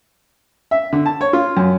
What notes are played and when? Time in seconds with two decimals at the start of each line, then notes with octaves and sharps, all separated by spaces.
0.71 E5
0.93 D3
1.06 A5
1.21 C#5
1.33 F4
1.57 F#2